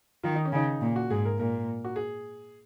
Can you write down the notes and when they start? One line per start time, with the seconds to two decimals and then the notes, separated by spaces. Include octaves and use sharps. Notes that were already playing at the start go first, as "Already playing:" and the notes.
0.23 D#3 F4
0.35 D#4
0.45 C#4
0.53 C#3 D#4
0.81 A#2
0.96 F#4
1.10 G#2 G#4
1.25 A#4
1.39 A#2 A#4
1.85 F#4
1.96 G#4